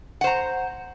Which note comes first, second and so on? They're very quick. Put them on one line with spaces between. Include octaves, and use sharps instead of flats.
F#5 C5 A#5